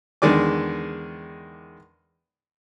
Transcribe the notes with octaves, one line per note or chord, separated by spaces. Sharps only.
E2 D3 D#3 G#3 D5 D6